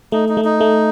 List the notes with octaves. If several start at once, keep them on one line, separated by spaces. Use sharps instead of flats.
A3 D#4
D#4
A3
D#4
A3